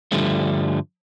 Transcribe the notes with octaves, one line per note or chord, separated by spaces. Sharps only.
G2 D3 F3 G3 A3